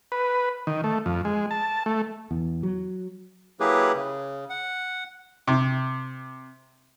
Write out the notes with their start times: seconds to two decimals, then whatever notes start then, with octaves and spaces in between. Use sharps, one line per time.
0.12 B4
0.67 D#3
0.84 A3
1.06 F2
1.25 G#3
1.51 A5
1.86 A3
2.31 E2
2.63 F#3
3.60 F#3 A#3 E4 G4 G#4 B4
3.94 C#3
4.50 F#5
5.48 C3